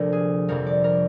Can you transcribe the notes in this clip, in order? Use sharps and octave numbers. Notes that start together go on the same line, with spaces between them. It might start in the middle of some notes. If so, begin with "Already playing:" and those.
Already playing: D2 C3 F3 A#3 A#4
G#4
G1 F2 C3 F3 A#4
D5
A#4